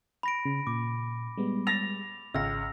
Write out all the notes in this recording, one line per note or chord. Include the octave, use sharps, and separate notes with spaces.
B5 A#6 D7
C#3
A#2 D6
G3 G#3 B3
A6 A#6 F7
G#1 C#2 E6 F6 A#6